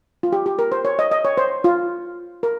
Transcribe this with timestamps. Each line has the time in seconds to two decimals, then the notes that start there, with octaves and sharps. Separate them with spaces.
0.23 F4
0.32 G4
0.46 G4
0.59 A#4
0.72 C5
0.85 C#5
0.99 D#5
1.11 D#5
1.25 C#5
1.37 C5
1.64 F4
2.43 A#4